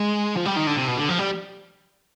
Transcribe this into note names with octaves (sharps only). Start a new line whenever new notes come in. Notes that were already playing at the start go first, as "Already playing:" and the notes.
Already playing: G#3
F3
G3
D#3
D3
C3
B2
D3
F3
G3